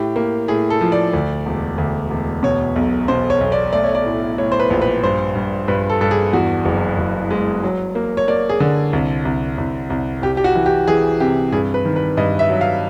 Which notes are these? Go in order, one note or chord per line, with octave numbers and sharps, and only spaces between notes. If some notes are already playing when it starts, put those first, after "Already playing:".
Already playing: A2 G4
A#3
A2 G#4
A4
F3
D5
D2
E1
D2
E1
B2 C#5
B1
B2 C5
C#5
B1
D5
A3 D5
C#5
D5
A2
A2 C#5
C5
B4
A#1
B4
G2 C5
G2
G2 B4
A4
G2 A4
G#4
E2 F#4
F#1
F#1
G#3
F#3
A#3
C#5
A#3 D5
G#4
D3
C2
C2
C2
C2
C2 G4
G4
F#4
E3
G4
E3 G#4
C3 G4
G2 G#4
B4
D#3
B4
G2 D#5
E5
F#3
F5